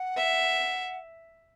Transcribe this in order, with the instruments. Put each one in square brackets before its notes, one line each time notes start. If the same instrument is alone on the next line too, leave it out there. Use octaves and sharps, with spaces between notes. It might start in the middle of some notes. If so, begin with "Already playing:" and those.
Already playing: [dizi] F#5
[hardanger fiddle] E5